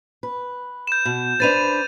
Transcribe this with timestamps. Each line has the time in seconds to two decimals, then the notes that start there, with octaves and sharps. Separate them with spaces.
0.23 B4
0.87 G6 E7
1.05 B2
1.40 D4 B4 C5 A6 D#7 F7